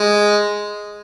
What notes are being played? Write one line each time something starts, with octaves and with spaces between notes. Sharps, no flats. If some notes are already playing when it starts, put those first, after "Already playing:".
Already playing: G#3